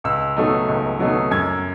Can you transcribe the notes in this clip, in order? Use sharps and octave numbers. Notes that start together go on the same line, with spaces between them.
C#2 E6
B2 F#3 A3 D#4
C#2
B2 F#3 A3 D#4
F#2 G#6